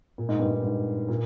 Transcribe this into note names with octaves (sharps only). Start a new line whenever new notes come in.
A#2
G#2
G2
G#2
G#2
A#2